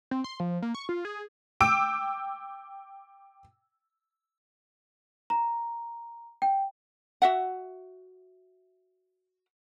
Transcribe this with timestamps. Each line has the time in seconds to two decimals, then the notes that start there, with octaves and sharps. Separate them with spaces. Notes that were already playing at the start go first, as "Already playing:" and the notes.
0.11 C4
0.24 C6
0.40 F3
0.62 A#3
0.75 C#6
0.89 F4
1.05 G#4
1.60 G5 D6 E6 D7
5.30 A#5
6.42 G5
7.22 F#4 E5 F#5